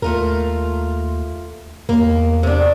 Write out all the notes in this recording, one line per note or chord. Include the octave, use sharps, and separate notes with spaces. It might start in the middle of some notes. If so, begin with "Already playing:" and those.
D#2 A3 F4 A#4
E2 A#3
C3 D4